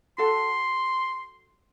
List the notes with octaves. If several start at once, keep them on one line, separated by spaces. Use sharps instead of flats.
F#4 A4 F#5 C6